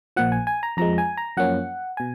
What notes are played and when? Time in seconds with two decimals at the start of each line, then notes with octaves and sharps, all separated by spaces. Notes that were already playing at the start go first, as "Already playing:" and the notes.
0.16 A#1 A#2 F3 F#5
0.32 G#5
0.47 G#5
0.63 A#5
0.77 F2 F3 G#3 A#5
0.98 G#5
1.17 A#5
1.37 F#2 F3 A#3 C#4 F#5
1.97 B2 G#5